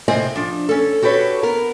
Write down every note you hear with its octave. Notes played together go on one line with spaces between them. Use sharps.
A2 C3 C4 C5 D#5 G#5
F3 D4
C#4 A4
F#4 G4 A4 B4 C#5
B3 A#4